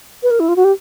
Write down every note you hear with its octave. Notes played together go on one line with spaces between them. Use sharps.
B4
A#4
E4
F4
F#4
G4